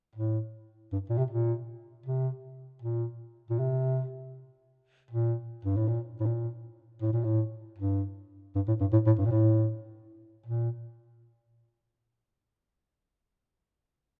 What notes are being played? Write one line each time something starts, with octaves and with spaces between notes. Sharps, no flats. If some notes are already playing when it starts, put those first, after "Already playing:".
A2
G2
A#2
C3
A#2
C3
A#2
A#2
C3
A#2
G2
A2
A#2
A2
A#2
A2
A#2
A2
G2
G2
A2
G2
A2
A2
G2
A#2
A2
A#2